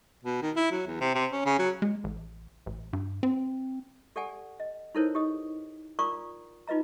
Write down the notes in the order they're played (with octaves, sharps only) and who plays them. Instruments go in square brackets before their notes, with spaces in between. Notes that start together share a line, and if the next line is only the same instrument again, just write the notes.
[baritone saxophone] B2
D#3
E4
F#3
E2
C3
C3
C#4
C#3
F#3
[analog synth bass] G#3
A1
A1
G2
C4
[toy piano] G4 A4 D5 F#5 G#5
D#5
D#4 E4 A4 A#4 C5 C#5
G4 D#5 D#6
F4 A#4 D5 A#5 C#6 D#6
D#4 F4 B4 D#5 A#5